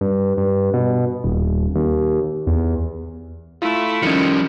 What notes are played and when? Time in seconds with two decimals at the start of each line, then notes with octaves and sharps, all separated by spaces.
0.01 G2
0.37 G2
0.74 B2
1.24 D#1
1.76 D#2
2.47 E2
3.62 A3 E4 F4
4.02 D#3 F3 G3 C#4 D#5 C#7